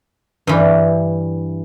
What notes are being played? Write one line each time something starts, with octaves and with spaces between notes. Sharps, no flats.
G2 E3